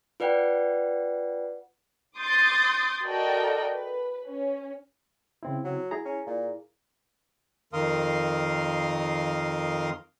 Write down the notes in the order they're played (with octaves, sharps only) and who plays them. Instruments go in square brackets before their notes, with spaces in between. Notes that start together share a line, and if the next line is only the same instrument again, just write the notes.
[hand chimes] F4 B4 D5 F#5 G5
[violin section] C6 D6 D#6 G6 A6
F#4 A4 A#4 D5 D#5 G5
B4
C#4
[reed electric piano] C#3 C4 E4
[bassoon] F#3
[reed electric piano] E4 G#4 A#5
[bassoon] C#4
A#2
[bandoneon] F2 D#3 A#4 F5 C6 D#6